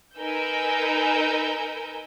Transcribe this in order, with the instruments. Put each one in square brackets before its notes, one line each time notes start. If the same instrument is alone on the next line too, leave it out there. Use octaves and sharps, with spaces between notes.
[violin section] D#4 A#4 B4 G#5 E6 G6